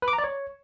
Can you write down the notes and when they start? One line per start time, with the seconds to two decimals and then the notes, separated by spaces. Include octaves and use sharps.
0.02 B4
0.08 D6
0.13 A#5
0.18 D5
0.24 C#5